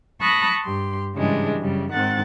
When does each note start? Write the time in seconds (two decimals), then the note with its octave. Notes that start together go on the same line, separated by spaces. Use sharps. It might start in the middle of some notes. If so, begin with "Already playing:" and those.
0.21 A5 B5 C#6 D#6 F#6 A#6
0.64 G2 G4 C6
1.15 G#2 C#3 E3 G3 G#3 D4
1.60 F#2 C#3 G3
1.92 G#2 D#3 C4 F#5 A6